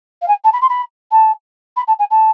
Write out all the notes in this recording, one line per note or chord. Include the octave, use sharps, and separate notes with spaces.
F5
G#5
A5
B5
C6
B5
A5
B5
A5
G#5
A5